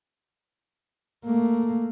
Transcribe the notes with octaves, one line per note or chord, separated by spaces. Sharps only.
A3 A#3